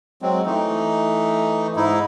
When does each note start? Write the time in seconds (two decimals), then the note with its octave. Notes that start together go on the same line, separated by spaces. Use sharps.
0.22 F#3 G#3 C4
0.46 E3 A3 D#4
1.76 G#2 D#4 E4